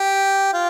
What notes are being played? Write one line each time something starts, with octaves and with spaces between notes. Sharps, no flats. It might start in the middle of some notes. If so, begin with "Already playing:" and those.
Already playing: G4
F4